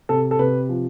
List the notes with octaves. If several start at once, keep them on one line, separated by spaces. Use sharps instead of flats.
C3 A4
A4
C3 B4
F3